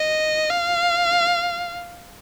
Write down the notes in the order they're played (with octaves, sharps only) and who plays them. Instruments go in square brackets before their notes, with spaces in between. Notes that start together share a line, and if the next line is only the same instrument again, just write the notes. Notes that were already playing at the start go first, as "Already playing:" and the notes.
Already playing: [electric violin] D#5
F5